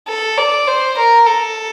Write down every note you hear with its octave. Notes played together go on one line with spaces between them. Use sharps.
A4
D5
C5
A#4
A4